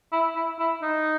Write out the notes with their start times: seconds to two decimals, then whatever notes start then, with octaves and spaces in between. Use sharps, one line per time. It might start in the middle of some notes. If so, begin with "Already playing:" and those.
0.13 E4
0.35 E4
0.59 E4
0.82 D#4